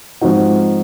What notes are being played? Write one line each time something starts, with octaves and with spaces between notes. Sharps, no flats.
G#2 F3 C4 D#4 F#4